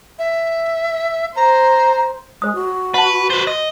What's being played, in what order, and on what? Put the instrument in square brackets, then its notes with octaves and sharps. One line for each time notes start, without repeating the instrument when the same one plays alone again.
[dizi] E5
[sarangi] C5 [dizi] A#5
[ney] G#3 [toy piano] C5 D#6
[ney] F#4
[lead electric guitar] B4 [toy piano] F#5 A5
[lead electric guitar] B4 C5
D#5